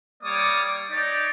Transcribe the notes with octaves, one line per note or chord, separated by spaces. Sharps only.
G3 A#3 C#5 D5 D6 D#6
D#4 G4 C#5 D5